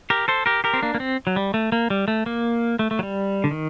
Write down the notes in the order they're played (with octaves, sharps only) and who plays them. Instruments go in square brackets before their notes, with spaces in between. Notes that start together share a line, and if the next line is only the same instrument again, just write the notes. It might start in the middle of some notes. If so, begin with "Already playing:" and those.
[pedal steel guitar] G4 A#4
A4 C5
G4 A#4
G4 A#4
C4
A#3 D4
A#3
C4
F#3
G3
A3
A#3
G3
A3
A#3
A3
A3
F#3
G3
D3
D#3